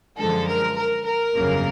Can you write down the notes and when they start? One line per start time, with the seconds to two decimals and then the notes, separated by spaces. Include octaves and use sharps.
0.18 F#2 D3 F3 G#3 A4
0.47 A#4
0.77 A#4
1.05 A#4
1.35 G1 F2 C#3 F#3 A#3